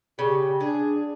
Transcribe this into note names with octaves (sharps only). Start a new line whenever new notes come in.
C#3 G4
D4 G#4